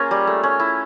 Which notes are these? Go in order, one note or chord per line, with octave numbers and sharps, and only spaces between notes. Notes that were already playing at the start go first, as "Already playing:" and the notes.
Already playing: A#3 C#4 F4 G#4 A#4
G3
A3
C#4
E4